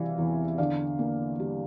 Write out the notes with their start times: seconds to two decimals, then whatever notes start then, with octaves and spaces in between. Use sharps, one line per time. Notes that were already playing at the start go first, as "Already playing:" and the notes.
Already playing: C3 E3 G3 D5 F5
0.18 E2
0.58 D3 D5 F5
0.99 A#3
1.39 G3